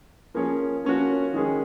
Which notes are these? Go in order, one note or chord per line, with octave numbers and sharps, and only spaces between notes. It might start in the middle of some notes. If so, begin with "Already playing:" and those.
F3 A#3 C#4 G#4
F3 A#3 C#4 F#4
D#3 G#3 C#4 G#4